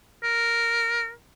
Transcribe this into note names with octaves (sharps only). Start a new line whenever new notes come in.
A#4